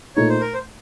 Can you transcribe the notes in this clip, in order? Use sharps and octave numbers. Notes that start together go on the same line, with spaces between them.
A#2 A3 D#4 C#5
C5
A#4
C5